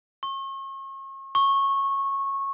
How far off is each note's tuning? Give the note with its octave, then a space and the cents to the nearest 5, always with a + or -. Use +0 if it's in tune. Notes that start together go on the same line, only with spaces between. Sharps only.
C#6 -40
C#6 -15